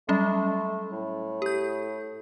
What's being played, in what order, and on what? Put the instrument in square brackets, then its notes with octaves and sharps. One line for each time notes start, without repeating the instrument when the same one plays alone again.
[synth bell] F#3 G3 C#4 [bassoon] A3
[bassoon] A2
[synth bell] G4 G6